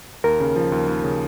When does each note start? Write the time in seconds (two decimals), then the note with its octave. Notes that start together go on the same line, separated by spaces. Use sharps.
0.24 D#2 A#4
0.40 C#3
0.56 F3
0.72 D#2
0.88 D#2
1.04 C#3